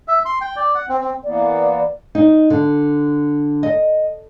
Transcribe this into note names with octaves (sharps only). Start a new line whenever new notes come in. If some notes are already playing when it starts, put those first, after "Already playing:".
E5
C6
G5
D5
F#5
C4
C4
E3 A#3 B3 D5
D#4
D3
D#5